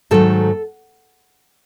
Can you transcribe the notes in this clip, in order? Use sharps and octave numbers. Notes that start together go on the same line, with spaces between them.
G#2 D#3 F#3 A3 A4